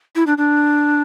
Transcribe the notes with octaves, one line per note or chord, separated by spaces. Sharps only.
E4
D4
D4